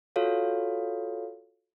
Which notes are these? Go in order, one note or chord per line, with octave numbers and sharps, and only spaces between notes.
F4 F#4 A4 C#5 F5